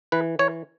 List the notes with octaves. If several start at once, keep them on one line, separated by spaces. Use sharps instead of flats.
E3 B4
E3 C#5